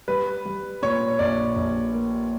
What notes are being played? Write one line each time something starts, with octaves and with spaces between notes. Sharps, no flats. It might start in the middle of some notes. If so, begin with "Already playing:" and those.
G3 B4
G3
A#2 C#5
A#1 D5
A#1
A#3